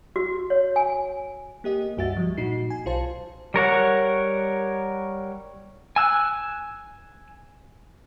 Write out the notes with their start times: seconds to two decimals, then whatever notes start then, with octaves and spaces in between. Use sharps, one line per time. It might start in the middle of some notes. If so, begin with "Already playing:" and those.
0.16 F#4
0.50 C#5
0.76 G#5
1.64 A#3 G4 D#5
1.97 C#2 G2 F#4 E5 A6
2.17 F3 G3
2.37 A#2 D#4 F#4 C7
2.70 G#5
2.85 B1 F4 C5 A5
3.54 G3 A#4 C#5 F#5
5.96 G#5 E6 F#6